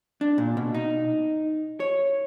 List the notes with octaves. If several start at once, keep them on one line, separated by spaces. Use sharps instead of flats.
D4
A#2
B2
D#4
C#5